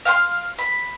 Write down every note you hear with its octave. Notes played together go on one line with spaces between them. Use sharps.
F5 F#5 C6
B5